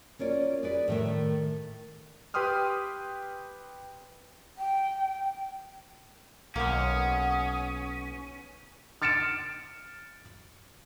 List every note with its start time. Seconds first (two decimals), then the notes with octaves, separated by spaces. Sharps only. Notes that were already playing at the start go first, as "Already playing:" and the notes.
0.19 A#3 C#4 F4 D5
0.63 G#4 B4 D5
0.88 A2 D#3 A3
2.34 G4 B4 G5 C6 D#6 F6
4.58 G5
6.56 B1 A#3 C#4 C5 F#5 D#6
9.02 F6 A6 C#7 D7 E7